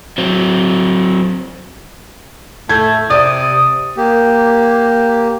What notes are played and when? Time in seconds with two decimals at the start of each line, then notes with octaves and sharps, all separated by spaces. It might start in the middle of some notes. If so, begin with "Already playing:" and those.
0.18 F#3 C4
2.69 A2 A3 G6 G#6
3.10 C3 D5 D#6
3.97 A#3 G4